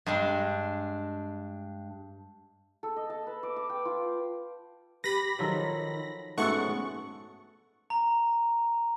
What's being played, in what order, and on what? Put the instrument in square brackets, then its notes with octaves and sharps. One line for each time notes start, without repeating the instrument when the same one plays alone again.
[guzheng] G2 G#3 D4
[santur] A4
D#5
A5
B4
D6
D6
G5
F4
[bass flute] G4 [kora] B4 [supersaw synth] B5 A#6
[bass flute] D#3 [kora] F3 F#3 A4
[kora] G#2 A4 [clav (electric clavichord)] A3 B3 F#4 [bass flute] C#4 [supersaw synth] F#5 C#6
[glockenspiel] A#5